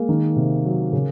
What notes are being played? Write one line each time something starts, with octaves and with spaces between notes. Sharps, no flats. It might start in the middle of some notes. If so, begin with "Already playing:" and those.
Already playing: G#3 A#3
D#3
C3
F#3
C#3